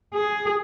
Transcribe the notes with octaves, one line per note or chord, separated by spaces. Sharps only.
G#4